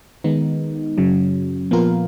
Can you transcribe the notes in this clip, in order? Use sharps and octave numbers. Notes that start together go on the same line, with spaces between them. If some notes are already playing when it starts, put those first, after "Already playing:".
D#3 G#3 B3 D#4
F#2 C#3 F#3
A#2 F3 B3 F4 A#4